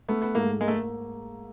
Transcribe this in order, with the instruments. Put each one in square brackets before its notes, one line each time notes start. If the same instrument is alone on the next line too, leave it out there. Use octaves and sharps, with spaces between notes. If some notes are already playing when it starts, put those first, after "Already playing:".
[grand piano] A3 [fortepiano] B3
[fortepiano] B3
[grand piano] G#2 [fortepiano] A#3
[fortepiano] G#3 [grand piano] A#3
[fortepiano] A3